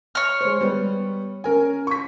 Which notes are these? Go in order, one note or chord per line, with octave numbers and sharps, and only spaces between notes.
C#5 F6
G#3 C5
G3 B3
C#4 A#4 G#5
C#6 B6